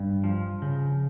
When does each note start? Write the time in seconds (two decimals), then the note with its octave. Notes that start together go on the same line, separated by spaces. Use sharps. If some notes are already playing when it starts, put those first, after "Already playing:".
Already playing: G2
0.24 F3
0.62 C#3